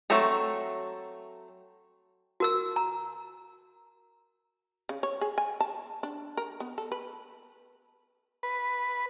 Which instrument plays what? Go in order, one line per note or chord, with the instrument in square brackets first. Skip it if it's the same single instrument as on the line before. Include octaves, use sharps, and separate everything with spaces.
[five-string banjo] F#3 A3 C4 A4 A#5
[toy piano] F#4 A#4 E6
A#5
[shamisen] C#3
C#5
G#4
G#5
A5
D4
A#4
B3
A4
B4
[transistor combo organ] B4